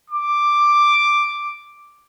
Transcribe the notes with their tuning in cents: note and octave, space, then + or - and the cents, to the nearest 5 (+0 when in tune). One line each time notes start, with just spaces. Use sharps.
D6 +5